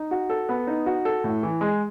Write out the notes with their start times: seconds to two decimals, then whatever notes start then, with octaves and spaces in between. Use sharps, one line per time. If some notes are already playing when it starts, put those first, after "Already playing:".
Already playing: D#4
0.11 F#4
0.30 A4
0.49 B3
0.67 D#4
0.86 F#4
1.05 A4
1.24 A2
1.43 E3
1.61 G#3